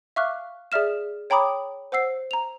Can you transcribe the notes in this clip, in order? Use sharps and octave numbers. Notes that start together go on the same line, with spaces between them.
E5 F5 C#6 D6 F6 F#6
G#4 D5 E5 F6 E7
C#5 G5 A#5 B5 D6 D#6
C5 F#5 E6 C7
A#5 F7